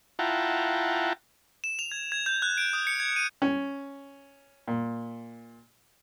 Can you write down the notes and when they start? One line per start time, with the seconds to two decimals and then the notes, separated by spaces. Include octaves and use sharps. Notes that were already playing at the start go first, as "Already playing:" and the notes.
0.19 E4 F4 F#5 G5 A5 A#5
1.64 E7
1.79 F7
1.92 G#6
2.12 G#6
2.26 G6
2.42 F#6
2.58 D7
2.73 D#6
2.87 C#7
3.00 G#6
3.16 D#7
3.42 C#4
4.68 A#2